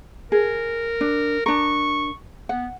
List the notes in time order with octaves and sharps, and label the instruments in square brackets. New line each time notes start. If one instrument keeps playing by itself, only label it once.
[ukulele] G#4 [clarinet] A#4
[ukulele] D4
[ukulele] D4 A#4 [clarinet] C#6
[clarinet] B3 [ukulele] F#5